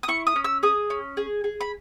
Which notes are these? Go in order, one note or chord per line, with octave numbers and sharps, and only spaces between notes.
D#6
E4 C#6
D#6
C#4
E6
G#4 D#6
C#4
G#4
G#4
B5